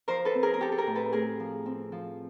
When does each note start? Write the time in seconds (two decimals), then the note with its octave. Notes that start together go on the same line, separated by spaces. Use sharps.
0.08 F3 A#4 C5
0.25 A4 B4
0.35 C4
0.43 G#4 A#4
0.54 A#4
0.59 C4 G4 A4
0.72 A4
0.77 G#4 A#4
0.87 A2
0.95 A4 B4
1.12 A3 G#4 A#4
1.40 F3
1.66 C4
1.92 F3